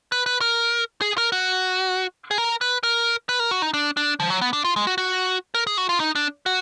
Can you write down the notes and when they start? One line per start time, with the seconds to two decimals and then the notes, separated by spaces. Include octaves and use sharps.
0.12 B4
0.26 B4
0.41 A#4
1.01 G#4
1.18 A#4
1.32 F#4
2.31 G#4
2.38 A#4
2.61 B4
2.83 A#4
3.29 B4
3.40 A#4
3.51 F#4
3.62 D#4
3.74 D4
3.97 D4
4.20 F3
4.30 F#3
4.41 B3
4.53 D4
4.64 F4
4.76 G#3
4.87 F#4
4.98 F#4
5.55 A#4
5.67 G#4
5.78 F#4
5.89 F4
6.00 D#4
6.15 D4
6.46 F#4